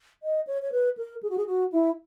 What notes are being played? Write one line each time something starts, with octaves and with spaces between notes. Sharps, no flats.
D#5
C#5
C#5
B4
A#4
G#4
F#4
G#4
F#4
E4